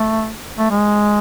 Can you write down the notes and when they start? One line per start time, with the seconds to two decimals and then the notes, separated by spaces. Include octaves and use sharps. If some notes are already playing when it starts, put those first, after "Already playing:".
Already playing: A3
0.59 A3
0.71 G#3